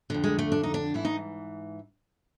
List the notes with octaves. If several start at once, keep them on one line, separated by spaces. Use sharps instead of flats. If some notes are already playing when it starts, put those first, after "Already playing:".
F2 D3
G#3
A3
D4
D#4
D4
G#2 E3 E4
D#4